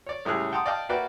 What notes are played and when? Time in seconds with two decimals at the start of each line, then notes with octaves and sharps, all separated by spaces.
0.06 C#5 D5
0.25 C#2 A2 G3 C#4 G#4 F#6
0.52 F#5 G5 A5 A#5 C6 D#6
0.66 D5 D#5 F5 G5 A5 D6
0.89 A#3 F#4 B4 D5 E5 G5